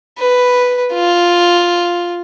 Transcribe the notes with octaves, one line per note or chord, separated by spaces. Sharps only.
B4
F4